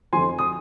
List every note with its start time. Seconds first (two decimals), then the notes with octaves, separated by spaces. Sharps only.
0.13 F2 D3 F3 G#5 C6
0.39 D#6